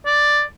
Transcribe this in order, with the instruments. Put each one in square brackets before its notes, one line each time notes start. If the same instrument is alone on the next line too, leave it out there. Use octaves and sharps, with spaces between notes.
[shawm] D5